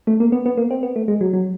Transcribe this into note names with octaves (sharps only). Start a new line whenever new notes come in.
A3
A#3
B3
B3
A#3
C4
B3
A3
G#3
F#3
F#3